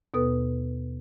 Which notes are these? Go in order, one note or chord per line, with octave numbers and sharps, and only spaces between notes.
D#2 B2 B3 A4 B4 D#6